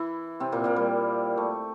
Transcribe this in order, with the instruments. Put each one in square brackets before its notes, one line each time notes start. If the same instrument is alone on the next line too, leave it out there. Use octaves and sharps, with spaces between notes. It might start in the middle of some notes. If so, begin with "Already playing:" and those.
Already playing: [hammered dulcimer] E3 E4
C3 C4
A#2 A#3
A#2 A#3
G3
A3